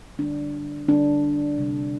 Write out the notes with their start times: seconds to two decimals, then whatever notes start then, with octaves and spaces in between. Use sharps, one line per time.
0.19 D3 G3 D4
0.89 D3 G3 D4
1.58 C3 G3